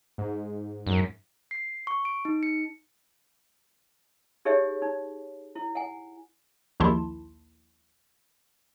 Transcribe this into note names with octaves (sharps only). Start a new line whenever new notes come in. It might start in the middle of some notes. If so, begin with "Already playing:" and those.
G#2
F#2
C7
C#6
D7
D#4
C#7
D#4 G4 G#4 C#5 E5
D#4
E4
F#5 G#5
A#1 D#2 D#3 E4 A5 C6